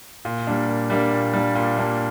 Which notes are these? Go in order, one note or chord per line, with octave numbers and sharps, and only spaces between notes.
A#2
G3 A#3 D4
A#2
G3 A#3 D4
A#2
G3 A#3 D4
A#2
G3 A#3 D4